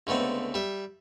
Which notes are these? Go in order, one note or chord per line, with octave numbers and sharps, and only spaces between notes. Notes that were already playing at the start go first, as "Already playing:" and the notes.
C#2 D3 A3 B3 C4
G3 E5